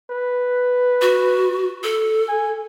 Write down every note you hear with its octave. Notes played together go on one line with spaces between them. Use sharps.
B4
F#4
A4
G#5